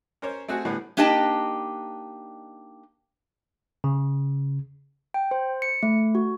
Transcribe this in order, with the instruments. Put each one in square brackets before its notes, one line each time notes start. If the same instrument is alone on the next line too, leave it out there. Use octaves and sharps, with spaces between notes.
[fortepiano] C#4 A#4 C5 C#5
A3 C4 F#4 G#4
A2 D3 E3 G3 B3
[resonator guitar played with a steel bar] A#3 D4 D#4 G4 D#5 A5
[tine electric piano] C#3
[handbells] G5
C5
C#7
A3
F#4